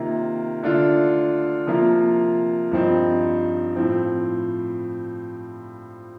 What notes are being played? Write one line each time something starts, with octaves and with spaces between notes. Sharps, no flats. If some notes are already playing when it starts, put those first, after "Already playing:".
Already playing: C3 D#3 A#3 F4
D3 A3 D4 F4
C3 F3 A#3 F4
G2 F3 C4 D#4
A2 F3 C4